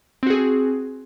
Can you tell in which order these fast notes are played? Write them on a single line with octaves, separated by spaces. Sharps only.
C4 F#4 G#4